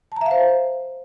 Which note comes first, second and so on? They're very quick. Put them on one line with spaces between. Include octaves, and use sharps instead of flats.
A5 A#5 E5 F5 C5